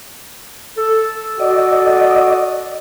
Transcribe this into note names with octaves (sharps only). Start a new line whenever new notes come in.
A4
F#4 D5 D#5